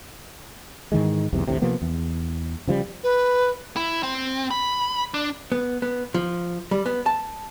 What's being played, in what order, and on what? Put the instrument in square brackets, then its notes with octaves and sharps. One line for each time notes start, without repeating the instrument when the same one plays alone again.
[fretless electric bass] G#2 D#3 E3 G#3
B1 E2 G#2 C3
A1 D2 A2 C3
C3 F3 A#3 B3
E2
C#3 F3 G3
[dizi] B4
[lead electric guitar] E4
C4
B5
D4
[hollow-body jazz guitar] B3
B3
F3
G3
B3
A5